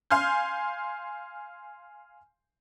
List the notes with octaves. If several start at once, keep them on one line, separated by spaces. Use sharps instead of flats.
F5 G#5 C6 F6 G6